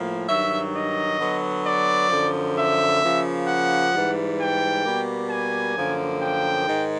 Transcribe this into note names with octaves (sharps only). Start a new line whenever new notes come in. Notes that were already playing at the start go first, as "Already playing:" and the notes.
Already playing: A2 F3 A#3
G2 D#3 F#3 E5
D#5
D3 F#3 B3
D5
F#2 D3 F3
E5
C#3 F3 A#3
F#5
G#2 E3 G3
G5
B2 G3 A#3
G#5
F#2 D3 F3 A#3
G5
G#2 D#3 G#3